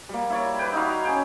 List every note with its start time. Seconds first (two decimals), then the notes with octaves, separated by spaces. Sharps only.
0.09 G3 A#3
0.30 E4 C#5 D5
0.59 B4 G5
0.73 D#4 E4 F#4 F5
1.04 C#4 G#4 G5